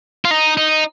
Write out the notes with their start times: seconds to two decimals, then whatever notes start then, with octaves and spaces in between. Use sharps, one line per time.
0.25 F4
0.31 D#4
0.57 D#4